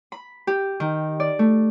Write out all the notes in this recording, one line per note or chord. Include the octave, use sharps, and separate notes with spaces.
B5
G4
D#3
D5
A3